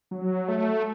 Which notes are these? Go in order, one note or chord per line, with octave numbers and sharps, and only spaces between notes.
F#3
A3